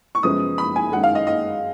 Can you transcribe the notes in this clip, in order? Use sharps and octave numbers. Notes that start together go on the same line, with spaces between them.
C#6
F#2 C#3 F3 G#3 B3 D#6
B5
G#5
F#2 D#3 G#3 F#5
F5
D#5
D#5